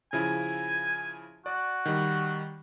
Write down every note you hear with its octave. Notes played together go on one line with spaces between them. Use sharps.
C#3 F3 E4 G#5
F#4 D5
D#3 G3